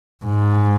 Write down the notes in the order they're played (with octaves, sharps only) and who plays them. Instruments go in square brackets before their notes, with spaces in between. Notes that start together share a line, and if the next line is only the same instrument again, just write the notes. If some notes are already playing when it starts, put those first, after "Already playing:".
[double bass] G#2